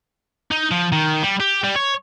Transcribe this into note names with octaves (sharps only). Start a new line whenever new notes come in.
D#4
F3
D#3
G3
G4
G3
C#5